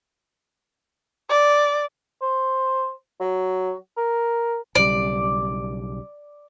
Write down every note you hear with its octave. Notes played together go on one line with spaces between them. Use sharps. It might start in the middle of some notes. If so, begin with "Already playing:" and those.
D5
C5
F#3
A#4
B1 C#3 G3 D5